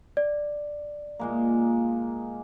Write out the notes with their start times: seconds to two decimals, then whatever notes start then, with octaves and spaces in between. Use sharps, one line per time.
0.17 D5
1.20 A#2 G#3 A#3